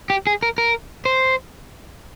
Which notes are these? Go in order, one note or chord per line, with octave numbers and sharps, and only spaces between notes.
G4
G#4
A#4
A#4
C5